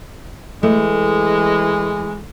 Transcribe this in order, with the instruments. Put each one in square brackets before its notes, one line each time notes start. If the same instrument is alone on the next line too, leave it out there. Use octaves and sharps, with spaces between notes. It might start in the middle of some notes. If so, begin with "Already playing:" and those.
[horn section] E3 G#3 [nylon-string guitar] A3